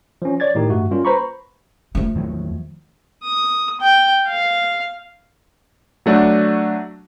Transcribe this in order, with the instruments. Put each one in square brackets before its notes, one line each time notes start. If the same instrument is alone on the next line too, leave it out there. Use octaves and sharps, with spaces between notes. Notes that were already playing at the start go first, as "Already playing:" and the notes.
[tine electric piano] F3 C#4
C#5 D5 G#6 A6
A2 D#3 D#4 G4
G2 A3 F#4
G3 A#3 C#4 F4
B4 C5 A#5 B5 C#6
[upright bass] F3 A3
[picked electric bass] E2 D#3 F#3
[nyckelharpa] D#6
G5
F5
[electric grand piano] F#3 A3 D4 F#4